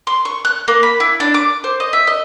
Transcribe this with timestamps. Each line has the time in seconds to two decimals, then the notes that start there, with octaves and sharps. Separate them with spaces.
0.07 C6
0.25 C#6
0.45 F#6
0.68 A#3
0.83 B5
1.00 E4
1.20 D4
1.34 D6
1.64 C5
1.80 D#5
1.93 E5
2.07 D#5